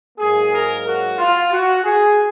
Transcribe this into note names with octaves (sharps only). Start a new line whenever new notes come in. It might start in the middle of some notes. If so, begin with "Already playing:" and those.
G#2 F#3 A#3 G#4
A#4
F#4
F4
F#4
G#4